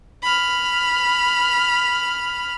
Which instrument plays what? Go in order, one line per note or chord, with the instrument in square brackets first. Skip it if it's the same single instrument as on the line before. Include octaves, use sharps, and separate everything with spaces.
[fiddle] B5 F6